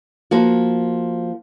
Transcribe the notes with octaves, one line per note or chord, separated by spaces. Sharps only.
F3 A#3 F#4